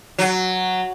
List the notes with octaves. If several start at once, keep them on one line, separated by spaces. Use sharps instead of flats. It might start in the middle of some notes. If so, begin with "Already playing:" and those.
F#3